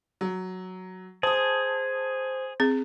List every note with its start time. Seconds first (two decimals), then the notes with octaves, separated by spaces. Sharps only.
0.21 F#3
1.23 G#4 C5 A5 D#6
2.60 C4 G#4